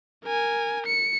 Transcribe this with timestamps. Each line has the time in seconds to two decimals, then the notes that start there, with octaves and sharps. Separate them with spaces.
0.24 A#4 G#5
0.87 C#7